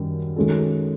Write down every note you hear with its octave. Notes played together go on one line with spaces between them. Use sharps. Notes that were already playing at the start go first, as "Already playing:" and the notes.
Already playing: F#2 D#3 G3
D#3 G#3 C#4 F#4 A4